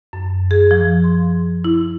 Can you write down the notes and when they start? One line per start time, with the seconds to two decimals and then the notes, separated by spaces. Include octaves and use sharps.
0.13 F#2
0.51 G#4
0.71 F3
1.04 C6
1.65 E4